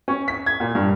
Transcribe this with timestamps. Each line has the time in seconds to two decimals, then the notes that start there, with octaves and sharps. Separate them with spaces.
0.08 C#4
0.28 B6
0.46 G#6
0.60 A#2
0.75 G2